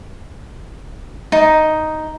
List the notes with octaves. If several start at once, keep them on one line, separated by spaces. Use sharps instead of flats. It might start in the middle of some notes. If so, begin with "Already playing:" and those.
D#4